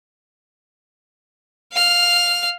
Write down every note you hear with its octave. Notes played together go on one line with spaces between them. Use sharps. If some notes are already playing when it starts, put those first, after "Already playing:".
F5 F6